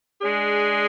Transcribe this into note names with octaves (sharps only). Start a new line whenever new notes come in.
G#3 D4 G#4